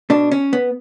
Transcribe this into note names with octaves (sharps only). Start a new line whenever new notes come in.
B2 D4
C#4
B3